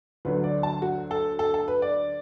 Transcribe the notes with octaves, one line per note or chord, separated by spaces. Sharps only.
D2 D3 F#3 B4
D5
A5
F#4
A4
A4
A4
B4
D5